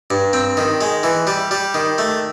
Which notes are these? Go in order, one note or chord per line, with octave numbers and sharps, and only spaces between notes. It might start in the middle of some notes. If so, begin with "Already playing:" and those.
G2
C4
D#3
G#3
E3
G3
G3
D#3
A3